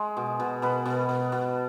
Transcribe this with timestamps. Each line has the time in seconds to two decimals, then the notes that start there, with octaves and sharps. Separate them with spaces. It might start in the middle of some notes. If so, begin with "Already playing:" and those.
Already playing: G#3
0.17 B2
0.40 B2
0.62 B2 B4
0.86 B2
1.09 B2
1.32 B2